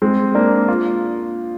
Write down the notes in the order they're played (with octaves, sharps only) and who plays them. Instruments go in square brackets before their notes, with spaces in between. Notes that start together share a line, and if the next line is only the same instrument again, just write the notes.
[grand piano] G#3 C4
A#3 D4
F4